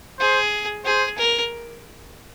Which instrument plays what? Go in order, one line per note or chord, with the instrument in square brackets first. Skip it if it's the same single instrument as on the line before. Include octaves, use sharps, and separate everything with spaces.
[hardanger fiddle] G#4 [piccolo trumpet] C5
[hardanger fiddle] G#4 [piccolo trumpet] C5
[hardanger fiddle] A#4